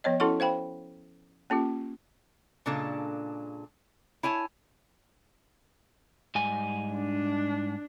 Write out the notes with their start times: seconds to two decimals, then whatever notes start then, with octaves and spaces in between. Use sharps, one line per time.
0.04 F3 B3 C#5 D#5
0.20 C#4 E4 F#4 A4 F#5 C#6
0.40 C5 F5 G5 B5
1.50 A#3 C#4 F4 G4
2.66 A#2 C#3 G#3 D4 A4
4.23 E4 C#5 G#5 A5
6.35 G#2 G3 G#5
6.94 D4